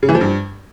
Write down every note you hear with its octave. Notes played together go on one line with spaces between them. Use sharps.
C#3
E3
F3
G2